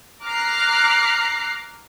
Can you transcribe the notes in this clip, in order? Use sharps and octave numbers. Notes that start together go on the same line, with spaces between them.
A#5 D6 F6 F#6 A#6 C7